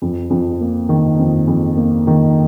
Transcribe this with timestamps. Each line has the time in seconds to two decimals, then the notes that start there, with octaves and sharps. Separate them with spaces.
0.02 F2
0.30 F2
0.61 A#3
0.89 D#3
1.19 F2
1.47 F2
1.77 A#3
2.07 D#3